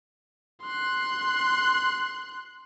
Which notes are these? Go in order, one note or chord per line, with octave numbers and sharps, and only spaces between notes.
C6 F#6